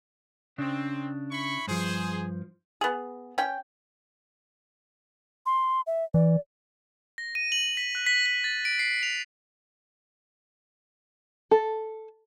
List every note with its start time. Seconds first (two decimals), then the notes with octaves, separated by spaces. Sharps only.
0.58 C#3 C4 D4
1.31 E4 B5 C#6
1.67 G2 F3 G#4 C5
2.81 B3 G#4
3.38 C#4 G5
5.46 C6
5.87 E5
6.14 E3 D5
7.18 A#6
7.35 D#7
7.52 F#7
7.77 B6
7.95 F#6
8.06 B6
8.26 B6
8.44 A6
8.65 D7
8.79 C7
9.03 F7
11.51 A4